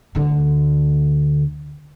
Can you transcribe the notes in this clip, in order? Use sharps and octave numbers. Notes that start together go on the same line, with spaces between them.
D2 D3